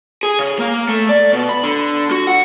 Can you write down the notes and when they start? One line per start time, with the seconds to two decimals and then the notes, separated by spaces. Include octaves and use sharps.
0.23 G#4
0.39 C#3
0.59 A#3
0.88 A3
1.09 D5
1.33 B2
1.49 B5
1.63 D3
2.11 F#4
2.27 F#5